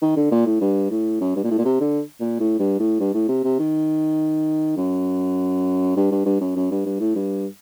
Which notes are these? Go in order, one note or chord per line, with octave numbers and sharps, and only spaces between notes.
D#3
D3
A#2
A2
G2
A2
F#2
G2
A#2
A2
A#2
C3
D3
A#2
A2
G2
A2
G2
A2
C3
C3
D#3
F#2
G2
G2
G2
F#2
F#2
G2
G2
A2
G2